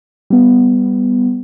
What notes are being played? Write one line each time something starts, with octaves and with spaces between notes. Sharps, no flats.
G3 B3